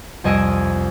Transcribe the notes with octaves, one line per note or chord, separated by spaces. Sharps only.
C2 F2 D#5 G#5 E6 D7